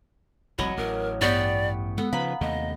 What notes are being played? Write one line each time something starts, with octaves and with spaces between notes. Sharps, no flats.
F1 C2 F#3 C#5 D#5 B5
A1 A#4
G2 B3 G4 D5 G5 C#6 C#7
G#3 B3 A4
C#3 F3 B4 F5 A#5 B5
D#2 C3 A3 D#5